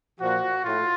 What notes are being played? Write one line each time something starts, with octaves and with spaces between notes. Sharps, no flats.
A#2 F3 F#4
A2 F4